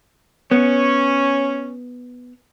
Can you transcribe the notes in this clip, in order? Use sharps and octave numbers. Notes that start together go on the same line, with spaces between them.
B3 C#4